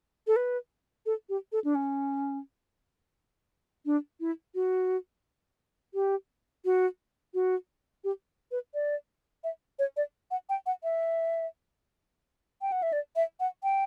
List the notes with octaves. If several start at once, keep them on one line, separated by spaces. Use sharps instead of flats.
A4
B4
A4
G4
A4
D4
C#4
D4
E4
F#4
G4
F#4
F#4
G4
B4
D5
E5
C#5
D5
F#5
G5
F#5
E5
G5
F#5
E5
D5
E5
F#5
G5